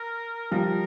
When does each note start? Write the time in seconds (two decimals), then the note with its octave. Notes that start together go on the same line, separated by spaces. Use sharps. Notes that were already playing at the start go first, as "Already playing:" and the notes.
Already playing: A#4
0.51 F3 G3 A#4